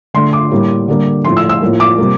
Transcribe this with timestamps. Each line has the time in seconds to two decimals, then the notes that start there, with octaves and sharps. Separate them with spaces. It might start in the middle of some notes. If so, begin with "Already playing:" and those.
0.14 D3 A3 C6
0.33 D6
0.51 A2 G3 A#3
0.88 D3 G3 A#3
1.25 A2 F3 A3 C6
1.37 E6
1.49 E6
1.62 A2 F3 A#3
1.80 D6
1.98 C3 G3 A#3